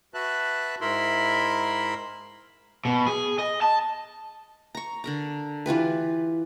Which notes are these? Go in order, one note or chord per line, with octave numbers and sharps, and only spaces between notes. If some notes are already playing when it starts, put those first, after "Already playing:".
F#4 B4 E5 A5 F#6
G#2 E4 A#4 E5 B5 C6
B2
G#4
D#5
A5
A#5 C#6
D3 A#4 A#5
E3 F4 G4 B4